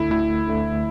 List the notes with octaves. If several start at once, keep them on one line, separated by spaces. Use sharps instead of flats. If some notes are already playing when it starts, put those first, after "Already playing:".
Already playing: D2 D3 A3 E4
D2 E4
D3 A3